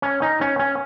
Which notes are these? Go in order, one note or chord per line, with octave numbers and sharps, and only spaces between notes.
C#4
D#4
C#4
C#4